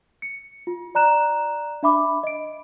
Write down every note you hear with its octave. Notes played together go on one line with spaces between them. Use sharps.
C#7
F4
D5 A#5 F#6 E7
D4 E5 B5 D6
D#5 D7